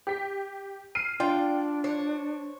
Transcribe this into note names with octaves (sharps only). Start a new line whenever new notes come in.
G4 B6
F6 C7 D#7
D4 F4 D5 G5
C5 C#5